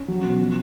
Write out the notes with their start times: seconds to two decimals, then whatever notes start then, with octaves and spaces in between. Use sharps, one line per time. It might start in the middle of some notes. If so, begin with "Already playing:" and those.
Already playing: C#4
0.08 F#3
0.23 B2
0.39 F3